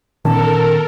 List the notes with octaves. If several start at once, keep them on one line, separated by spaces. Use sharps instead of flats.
G1 A#2 D#3 B3 C#4 A4 A#4 A5